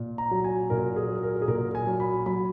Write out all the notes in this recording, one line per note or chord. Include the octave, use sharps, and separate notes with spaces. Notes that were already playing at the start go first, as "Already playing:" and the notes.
Already playing: A#2
A#5
F#3
G#5
A#2 A#4
G#4
F#3
A#4
G#4
A#2 A#4
G#5
F#3
B5
F#3 B5